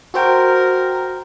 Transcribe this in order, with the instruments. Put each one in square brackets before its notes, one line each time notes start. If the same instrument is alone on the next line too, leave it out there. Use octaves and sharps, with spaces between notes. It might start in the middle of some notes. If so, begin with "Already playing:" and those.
[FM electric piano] F#4 C5 G5 [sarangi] A#4